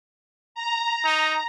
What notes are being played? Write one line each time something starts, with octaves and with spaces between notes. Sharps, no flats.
A#5
D#4